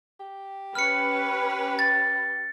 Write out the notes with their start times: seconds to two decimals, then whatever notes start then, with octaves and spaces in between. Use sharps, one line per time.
0.20 G4
0.75 C#4 B4 F6 C#7
1.79 A6